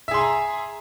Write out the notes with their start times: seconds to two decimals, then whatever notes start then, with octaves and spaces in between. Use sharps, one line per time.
0.08 E5
0.11 G#4
0.14 C6
0.17 G#5
0.20 A#5